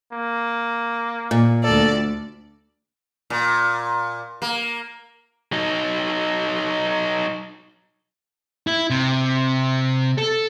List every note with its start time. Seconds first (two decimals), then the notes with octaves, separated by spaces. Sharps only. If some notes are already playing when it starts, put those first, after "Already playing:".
0.12 A#3
1.31 A#2
1.63 D2 A4 D5
3.30 A#2
4.42 A#3
5.52 F#3 D#4
8.67 E4
8.90 C3
10.18 A4